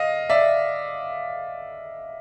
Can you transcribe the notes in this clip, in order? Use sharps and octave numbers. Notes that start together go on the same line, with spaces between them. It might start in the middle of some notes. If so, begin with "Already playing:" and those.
Already playing: D#5 F5
D5 E5